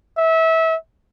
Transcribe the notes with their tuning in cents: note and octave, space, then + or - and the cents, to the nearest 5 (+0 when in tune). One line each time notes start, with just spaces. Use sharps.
E5 -25